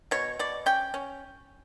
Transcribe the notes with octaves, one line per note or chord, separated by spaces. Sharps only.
B2 C#5
B2 D5
C#4 G5
C#4